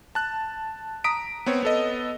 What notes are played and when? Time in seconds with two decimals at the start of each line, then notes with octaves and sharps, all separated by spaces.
0.15 A5 F#6
1.04 A#5 D#6 B6 D7
1.46 B3 C4 C#5
1.63 B3 A4 D#5